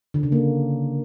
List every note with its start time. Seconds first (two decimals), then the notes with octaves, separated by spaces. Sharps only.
0.14 D3
0.23 C#3
0.32 A#3